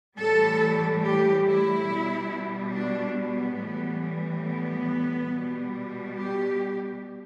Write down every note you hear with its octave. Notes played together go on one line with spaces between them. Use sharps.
A2 E3 G3 A4
G4
E4
B2
G3
D4
B3
A2 E3 G3
B3
B2 G3
G4